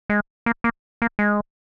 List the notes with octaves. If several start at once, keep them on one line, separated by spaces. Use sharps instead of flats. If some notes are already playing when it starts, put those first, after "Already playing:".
G#3
A#3
A#3
A#3
G#3